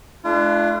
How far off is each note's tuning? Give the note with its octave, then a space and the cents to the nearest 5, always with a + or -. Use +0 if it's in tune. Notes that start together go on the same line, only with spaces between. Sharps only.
A3 -40 D4 +15 F4 -35